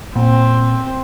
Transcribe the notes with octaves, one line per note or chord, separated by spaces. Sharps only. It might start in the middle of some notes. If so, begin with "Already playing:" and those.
A#2 C4